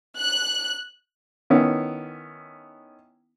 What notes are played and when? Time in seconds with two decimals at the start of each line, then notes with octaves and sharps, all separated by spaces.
0.18 F#6
1.50 D#3 B3 C#4 E4